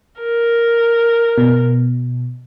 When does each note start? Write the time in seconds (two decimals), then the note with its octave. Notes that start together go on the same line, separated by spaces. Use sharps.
0.20 A#4
1.38 B2